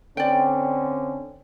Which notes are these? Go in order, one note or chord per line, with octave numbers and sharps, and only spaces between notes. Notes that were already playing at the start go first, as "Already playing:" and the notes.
D3 C4 C#4 D5 G5